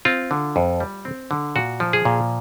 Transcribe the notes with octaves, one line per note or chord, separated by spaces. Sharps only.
C4 F4
D3
F2
G3
C4
D3
A#2 F#4
F3
G#4
A#2